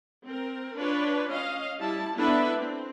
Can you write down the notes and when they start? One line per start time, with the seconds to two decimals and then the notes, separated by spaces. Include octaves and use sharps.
0.22 C4 A#4
0.77 D4 F4 B4 C#5
1.28 C#4 D#5 F5
1.79 G3 E4 A5
2.16 B3 D4 E4 A4 B4 E5
2.57 C4